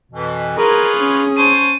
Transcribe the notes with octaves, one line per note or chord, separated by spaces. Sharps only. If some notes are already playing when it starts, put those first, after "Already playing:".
F2 B2 E3
F4 G#4 A#4 B4 C#5
C#4
C5 C#5 A5 D#7